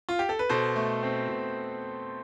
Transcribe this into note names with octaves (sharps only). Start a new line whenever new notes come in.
F4
G4
A4
B4
B2 A4 C5
A3
C4
B2